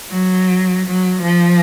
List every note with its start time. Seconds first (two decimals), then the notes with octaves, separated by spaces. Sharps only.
0.11 F#3
0.86 F#3
1.22 F3